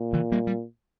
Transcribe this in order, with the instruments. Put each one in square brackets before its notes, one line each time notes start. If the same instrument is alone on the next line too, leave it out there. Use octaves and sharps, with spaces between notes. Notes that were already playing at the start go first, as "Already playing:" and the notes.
Already playing: [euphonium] A#2
[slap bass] C#3 E3
G3 A#3
G3